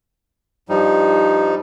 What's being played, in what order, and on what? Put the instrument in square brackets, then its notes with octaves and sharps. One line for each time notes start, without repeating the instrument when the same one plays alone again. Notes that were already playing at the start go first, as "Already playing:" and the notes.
[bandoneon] G2 F3 G3 D#4